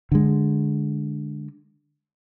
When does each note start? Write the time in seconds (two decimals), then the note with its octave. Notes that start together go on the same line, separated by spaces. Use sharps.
0.12 D3 G#3